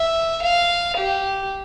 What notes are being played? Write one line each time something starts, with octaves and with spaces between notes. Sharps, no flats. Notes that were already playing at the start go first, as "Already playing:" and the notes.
Already playing: E5
F5
G4